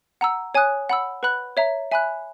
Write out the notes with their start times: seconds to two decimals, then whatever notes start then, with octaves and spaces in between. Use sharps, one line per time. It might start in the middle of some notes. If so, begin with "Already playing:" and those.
0.21 F#5 A#5 E6
0.55 C#5 G#5 D#6 F#6
0.90 F#5 B5 E6
1.23 B4 F#5 B5 F#6
1.57 C#5 E5 A#5
1.91 E5 G#5 B5 F#6